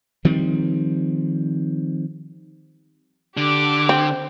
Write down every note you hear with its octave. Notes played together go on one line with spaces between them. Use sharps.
D#3 F3 G3 C4
D3 G4 D6
C4